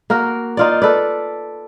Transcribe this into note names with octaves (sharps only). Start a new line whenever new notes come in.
A#3 F#4 A#4
D#4 F4 D5
A4 B4 D5